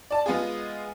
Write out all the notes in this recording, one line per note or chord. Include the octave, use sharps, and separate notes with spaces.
D5 A5
G#3 B3 F4 G#4